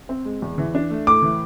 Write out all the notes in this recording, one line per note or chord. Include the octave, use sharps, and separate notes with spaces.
C4
G#3
E2
E3
D4
A3
A2 D6
E3